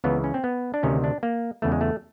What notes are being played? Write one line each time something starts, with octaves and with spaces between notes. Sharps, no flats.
C#2 C#3 E3 B3
C#4
C4
B3
D4
D2 C3 D#3 C#4
D4
A#3
E2 C#3 E3 A3
G#3
A3